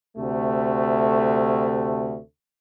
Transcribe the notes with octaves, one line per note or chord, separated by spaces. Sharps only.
D2 C3 A3